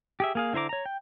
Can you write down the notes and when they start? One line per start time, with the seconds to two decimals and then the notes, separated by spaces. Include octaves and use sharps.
0.20 G4 G#4 E5
0.35 A#3 G#4 F5
0.53 D3 E4 C5 A#5 D6
0.69 C#5 A#5
0.86 G5